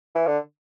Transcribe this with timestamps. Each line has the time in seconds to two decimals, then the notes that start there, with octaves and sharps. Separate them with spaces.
0.15 E3
0.27 D3